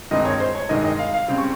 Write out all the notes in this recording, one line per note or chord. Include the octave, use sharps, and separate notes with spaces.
G2 D#3 G#3 C4 D#4 D#5
C#5
C5
C#5
G2 D#3 G#3 D#5
D#5
F5
F5
C#3 G3 C4
C#6